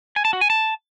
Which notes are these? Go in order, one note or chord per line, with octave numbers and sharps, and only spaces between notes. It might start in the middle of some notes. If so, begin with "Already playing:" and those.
G#5
A5
F#4
G#5
A5